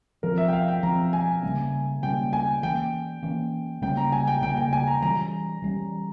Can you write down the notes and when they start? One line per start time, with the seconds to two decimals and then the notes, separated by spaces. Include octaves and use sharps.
0.23 F3 C4 A#4
0.38 E5
0.48 G5
0.53 F5
0.68 G5
0.83 F3 C4 A#5
1.13 G#5
1.43 C#3 G3 A#3 C#4
2.03 C#3 G3 A#3 C#4 G5
2.33 G#5
2.63 E3 A#3 C#4 G5
3.23 E3 A#3 C#4
3.82 C#3 G3 A#3 C#4 G5
3.97 A#5
4.12 G#5
4.28 G5
4.42 C#3 G3 A#3 C#4 G5
4.57 G5
4.73 G#5
4.88 A#5
5.02 E3 G3 C#4 A#5
5.62 E3 G3 C#4